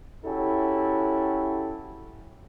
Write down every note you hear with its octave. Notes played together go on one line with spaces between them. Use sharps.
C#4 E4 F#4 G4 A4